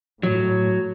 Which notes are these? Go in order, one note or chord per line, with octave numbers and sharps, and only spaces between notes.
A2 F#3